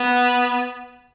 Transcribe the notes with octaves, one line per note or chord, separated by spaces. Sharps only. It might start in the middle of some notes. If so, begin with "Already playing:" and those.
Already playing: B3